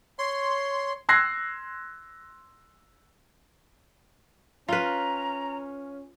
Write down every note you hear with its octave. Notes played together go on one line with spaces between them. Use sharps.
C#5 C6
C6 E6 F#6 G#6 A#6 C7
C#4 F4 B4 F5 A#5